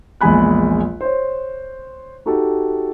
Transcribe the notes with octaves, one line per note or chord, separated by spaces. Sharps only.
A#1 E2 G#3 G#5 B5 F#6
C5 C#5
D#4 F#4 G4 A4